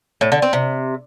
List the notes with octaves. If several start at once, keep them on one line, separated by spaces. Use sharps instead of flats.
A2
D3
C4
C3